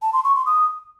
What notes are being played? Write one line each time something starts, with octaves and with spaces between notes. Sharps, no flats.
A5
C6
C#6
C6
D#6